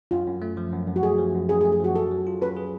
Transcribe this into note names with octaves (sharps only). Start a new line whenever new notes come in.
F#2 F4
F#2
A3
F3
F#2
F#2
F#4
A3 G#4
F3
F#2
F#2 G#4
G#4
A3
G#4
F3 F#4
G#4 A4
F#3
F4
C#4 B4
G#4